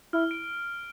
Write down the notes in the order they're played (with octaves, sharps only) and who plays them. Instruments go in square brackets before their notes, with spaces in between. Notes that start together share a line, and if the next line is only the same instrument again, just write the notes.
[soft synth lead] E4 [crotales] F6
[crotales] D7